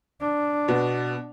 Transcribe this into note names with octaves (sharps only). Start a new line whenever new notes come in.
D4
B2 B3